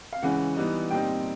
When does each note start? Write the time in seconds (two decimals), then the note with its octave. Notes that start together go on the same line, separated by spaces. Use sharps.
0.13 F5
0.23 C#3 E3 G#3 C#4 F#5
0.57 E3 G3 B3 D#4
0.90 A#2 G3 C4 D#4 G5